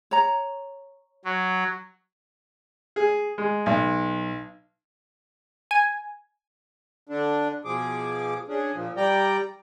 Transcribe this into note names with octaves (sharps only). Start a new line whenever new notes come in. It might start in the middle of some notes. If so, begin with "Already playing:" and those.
C#5 A#5
F#3
G#4
G#3
B1
G#5
D3 D4
B2 F3 G#4 D6
C#4 D4 G#4
A#2 F3
G3 D5 G5 A#5